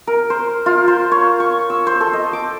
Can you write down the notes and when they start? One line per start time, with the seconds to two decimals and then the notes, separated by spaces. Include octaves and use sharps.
0.07 A#4
0.30 C5
0.66 F4
0.88 C5
1.11 C#5
1.40 C#6
1.70 E6
1.87 C5
2.01 A4
2.13 D#5
2.33 D6